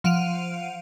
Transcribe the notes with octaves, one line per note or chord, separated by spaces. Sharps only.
F3 F5 F#5 D7 D#7 F7